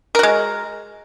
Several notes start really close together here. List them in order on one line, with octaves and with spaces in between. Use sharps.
A#4 F#4 G#3